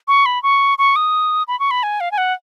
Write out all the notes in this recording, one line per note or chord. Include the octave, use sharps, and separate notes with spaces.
C#6
B5
C#6
C#6
D#6
B5
C#6
B5
G#5
F5
G#5
F#5